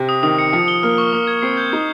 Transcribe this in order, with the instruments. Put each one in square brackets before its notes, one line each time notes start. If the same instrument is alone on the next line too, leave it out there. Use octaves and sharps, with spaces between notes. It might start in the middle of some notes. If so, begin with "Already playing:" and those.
Already playing: [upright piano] C3
[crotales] D#6
[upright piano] D#3 [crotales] D#6
[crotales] C#7
[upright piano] F3 [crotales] C#7
[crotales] G7
[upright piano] A#3 [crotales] F6
[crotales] C#6
[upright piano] A#3 [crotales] D#6
[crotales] G#6
[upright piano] C4 [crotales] C7
[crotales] G6
[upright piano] D#4 [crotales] G#6